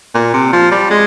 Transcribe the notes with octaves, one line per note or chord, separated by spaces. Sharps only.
A#2
C3
F3
G3
G#3